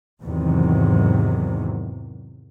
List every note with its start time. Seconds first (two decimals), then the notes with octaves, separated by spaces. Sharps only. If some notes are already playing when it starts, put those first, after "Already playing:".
0.22 E2 G#2 C3 D#3 F#3